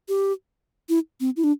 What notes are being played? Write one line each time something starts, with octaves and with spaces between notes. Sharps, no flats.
G4
E4
C4
E4
D4